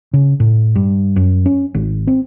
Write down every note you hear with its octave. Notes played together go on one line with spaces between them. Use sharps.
C#3
A2
G2
F#2
C#4
G#1
C4